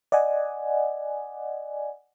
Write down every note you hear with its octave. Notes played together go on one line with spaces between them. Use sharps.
D5 D#5 F#5 G#5